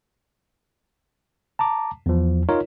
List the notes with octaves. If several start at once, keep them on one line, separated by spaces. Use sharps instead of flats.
A5 A#5 D6
E2 F3
D#4 F4 A#4 C#5